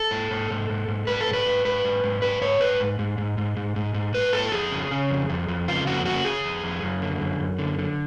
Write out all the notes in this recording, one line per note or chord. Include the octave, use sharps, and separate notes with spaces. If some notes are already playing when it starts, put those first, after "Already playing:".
Already playing: A4
G#2
G#2
G#2
G#2
G#2
G#2 B4
A4
G#2
B4
G#2
G#2 B4
G#2
G#2
G#2 B4
G#2 C#5
G#2 B4
G#2
G#2
G#2
G#2
G#2
G#2
G#2
G#2 B4
G#2 A4
F2 G#4
C#3
C#3
F2
F2
F2
C#3 F4
F2 F#4
C#3 F#4
C#3 G#4
F2
F2
F#2
D3
F#2
F#2
D3
D3